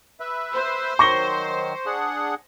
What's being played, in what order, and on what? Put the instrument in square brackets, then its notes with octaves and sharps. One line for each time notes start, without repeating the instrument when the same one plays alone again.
[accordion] B4 E5
[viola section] C5
[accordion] D#3 F#3 [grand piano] C#6 A#6 G7
[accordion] D4 G#4 F#5